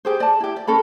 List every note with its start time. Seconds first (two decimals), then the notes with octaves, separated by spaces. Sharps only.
0.05 G4 G#4 C5
0.20 D5 A5
0.40 E4 G4
0.56 D5
0.67 C#4 A4 A#4 B5